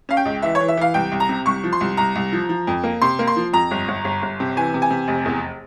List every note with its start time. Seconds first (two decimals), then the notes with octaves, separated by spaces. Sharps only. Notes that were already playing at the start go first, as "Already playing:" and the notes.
0.09 C#4 F5
0.17 G5
0.25 C#2
0.42 E3 E5
0.55 C#5
0.60 E3
0.68 E5
0.77 E3 F5
0.94 C2 G5
1.12 C2
1.20 A#5
1.29 C3
1.46 C2 C#6
1.64 F3
1.73 C6
1.81 C2
1.97 C2 A#5
2.16 C2
2.32 F3
2.49 F3
2.67 F2
2.83 A#3
3.02 C3 C6
3.19 A#3
3.27 C6
3.36 F3
3.53 F2 A#5
3.71 G1
3.88 G1
4.04 G1
4.22 G1
4.40 C3
4.57 E3 G#5
4.74 C3
4.82 G#5
4.90 C3
5.08 F1
5.26 E2